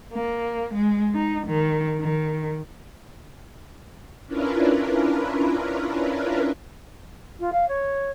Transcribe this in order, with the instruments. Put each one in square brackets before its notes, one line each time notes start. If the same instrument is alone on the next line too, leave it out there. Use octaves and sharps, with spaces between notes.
[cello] A#3
G#3
D#4
D#3
D#3
[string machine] C#4 D4 E4 F4 A#4 B4
[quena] F4
F5
C#5